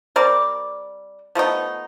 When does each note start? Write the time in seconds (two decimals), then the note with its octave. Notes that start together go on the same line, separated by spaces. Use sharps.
0.16 G3 C4 A#4 D5
1.35 F3 A3 B3 D#4